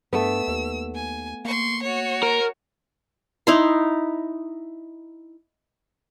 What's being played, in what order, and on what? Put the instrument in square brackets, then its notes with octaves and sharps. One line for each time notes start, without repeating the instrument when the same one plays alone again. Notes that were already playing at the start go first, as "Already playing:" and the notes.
[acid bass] G2 [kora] A3 B3 [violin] E6
[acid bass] D#2
[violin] G#5
[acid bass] A#3 [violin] C6 C#6
[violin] F#4 C#5
[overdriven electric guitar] A#4
[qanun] D#4 E4 C6